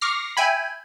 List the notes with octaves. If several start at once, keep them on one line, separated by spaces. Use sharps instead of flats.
C#6 D6 F6 A#6 C7
E5 G5 G#5 B5